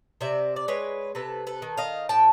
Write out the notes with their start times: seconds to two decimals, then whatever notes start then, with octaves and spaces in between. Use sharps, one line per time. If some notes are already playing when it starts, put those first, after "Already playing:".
0.21 C3 D5 E5
0.56 D5
0.68 G#3 B4 C#5
1.15 C3 A4 B4
1.47 A4 B4
1.62 D#3
1.77 D#5 F5
2.09 A2 G5 A5